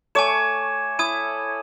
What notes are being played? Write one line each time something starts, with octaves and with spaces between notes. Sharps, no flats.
A3 C#5 G#5 D6 E7
E4 D#6 G#6 D#7